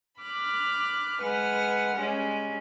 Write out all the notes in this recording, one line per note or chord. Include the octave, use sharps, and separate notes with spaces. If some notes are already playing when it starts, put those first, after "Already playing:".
B5 D6 F6 F#6
G#3 B4 F#5 F6
G3 G#3 C#4